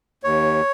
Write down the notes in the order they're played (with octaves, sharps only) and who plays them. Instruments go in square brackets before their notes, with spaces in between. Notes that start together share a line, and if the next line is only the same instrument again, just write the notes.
[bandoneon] D#2 C#5